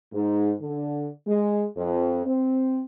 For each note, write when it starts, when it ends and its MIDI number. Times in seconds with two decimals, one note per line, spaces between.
0.14 0.53 44
0.61 1.09 50
1.27 1.65 56
1.77 2.24 41
2.26 2.82 60